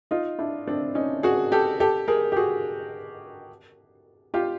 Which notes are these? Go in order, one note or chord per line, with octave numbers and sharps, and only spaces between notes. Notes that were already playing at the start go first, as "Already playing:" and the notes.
D#4 F4
D4 E4
C4 D4
C#4 D#4
F#4 G#4
G4 A4
G4 A4
G#4 A#4
G4
F#4 G#4
F4 G4